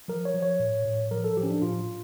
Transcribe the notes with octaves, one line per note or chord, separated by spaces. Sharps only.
F3 A#4
C#5
F3
C#5
A2
A2
F3 A#4
A4
F3 G4
C#4
D4
A2 F4